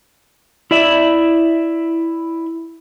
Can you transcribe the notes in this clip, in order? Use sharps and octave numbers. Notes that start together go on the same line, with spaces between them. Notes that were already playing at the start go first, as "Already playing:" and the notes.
E4 D5 E5